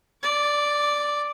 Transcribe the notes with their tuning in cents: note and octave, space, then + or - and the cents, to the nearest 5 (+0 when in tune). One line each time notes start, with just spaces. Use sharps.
D5 +0 D6 -35